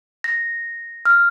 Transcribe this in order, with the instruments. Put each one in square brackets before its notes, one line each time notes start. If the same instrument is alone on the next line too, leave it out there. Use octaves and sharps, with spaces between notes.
[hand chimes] A#6
F6